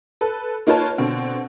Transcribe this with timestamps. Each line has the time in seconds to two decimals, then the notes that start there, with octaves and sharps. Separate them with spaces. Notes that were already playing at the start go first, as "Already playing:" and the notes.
0.21 A4 B4
0.67 A#3 D#4 F4 B4 C#5 A5
0.98 B2 D3 C4